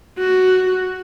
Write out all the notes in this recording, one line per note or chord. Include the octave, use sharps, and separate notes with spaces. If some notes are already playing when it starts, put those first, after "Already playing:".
F#4